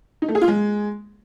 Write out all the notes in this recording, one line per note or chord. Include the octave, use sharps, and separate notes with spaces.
D#4
A3
G#4
F4
G#3